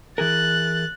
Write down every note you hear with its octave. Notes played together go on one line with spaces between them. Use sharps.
E3 G#4 A#4 F#6 A6